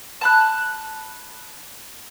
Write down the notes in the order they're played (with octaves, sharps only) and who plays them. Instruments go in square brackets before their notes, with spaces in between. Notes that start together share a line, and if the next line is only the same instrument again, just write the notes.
[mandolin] A5 B5 F#6